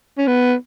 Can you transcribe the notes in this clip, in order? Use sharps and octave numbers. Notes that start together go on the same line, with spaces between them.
C#4
B3